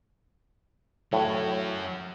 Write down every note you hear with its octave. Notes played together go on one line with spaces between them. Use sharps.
A2 F#3 C#4